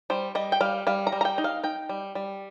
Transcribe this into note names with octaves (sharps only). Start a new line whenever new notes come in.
G3 C5
G3 D#5
G5
G3 F5
G3 F5
A#5
G3
A#5
G5
D#4
F5
D#4 G5
G3
G3